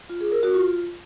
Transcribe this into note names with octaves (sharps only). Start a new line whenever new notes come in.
F4
G#4
A#4
F#4
F4